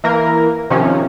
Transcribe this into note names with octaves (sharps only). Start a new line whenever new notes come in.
E3 A#3 A#4
C3 D#3 F3 C#4